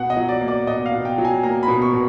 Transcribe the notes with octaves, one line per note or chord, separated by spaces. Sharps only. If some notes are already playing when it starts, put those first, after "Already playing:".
Already playing: B2 F#5
D#5
F#3
D5
A#3
D5
B2 D#5
F5
B2
G5
F#3
G#5
A#3 A#5
B5
B2
C#6
B2